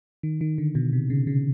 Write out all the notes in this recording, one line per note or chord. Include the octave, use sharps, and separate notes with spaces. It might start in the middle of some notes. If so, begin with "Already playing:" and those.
D#3
D#3
D3
B2
C3
C#3
C#3